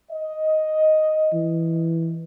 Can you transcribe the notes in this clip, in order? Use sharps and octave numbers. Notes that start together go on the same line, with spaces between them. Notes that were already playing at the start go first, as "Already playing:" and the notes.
D#5
E3